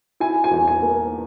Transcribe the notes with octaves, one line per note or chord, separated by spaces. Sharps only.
E4 G#5
G#5
E2
G#5
A#3